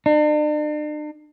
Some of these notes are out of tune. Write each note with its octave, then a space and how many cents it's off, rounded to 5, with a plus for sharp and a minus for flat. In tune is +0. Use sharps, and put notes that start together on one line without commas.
D4 +45